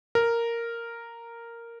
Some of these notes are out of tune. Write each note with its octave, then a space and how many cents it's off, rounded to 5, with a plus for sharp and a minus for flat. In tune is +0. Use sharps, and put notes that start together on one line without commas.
A#4 -5